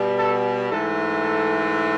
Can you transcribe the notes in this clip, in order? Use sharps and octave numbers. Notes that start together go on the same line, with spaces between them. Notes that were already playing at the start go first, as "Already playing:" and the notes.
Already playing: B2 G3
A4
G#2 E3 A3 A4
A4